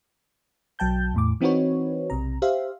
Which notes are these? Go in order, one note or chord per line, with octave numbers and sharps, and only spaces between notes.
B1 F#3 G5 A5 G6
E2 A2 D6
E3 C4 D#4 F#4 B4 C#5
B1 C3 A#5
G4 C5 E5 F5